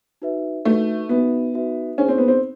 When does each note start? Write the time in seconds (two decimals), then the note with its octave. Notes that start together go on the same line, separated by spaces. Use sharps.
0.22 D#4 F#4 B4 E5
0.65 A3 D#4 F#4 B4 E5
1.09 B3 D#4 F#4 B4 E5
1.54 D#4 F#4 B4 E5
1.98 C#4 D#4 G#4 C5
2.08 C4
2.18 B3
2.28 C4